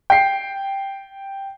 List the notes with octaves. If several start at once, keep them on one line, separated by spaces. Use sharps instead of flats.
G5 C7